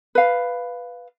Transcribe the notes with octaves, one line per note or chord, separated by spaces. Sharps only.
B4 F5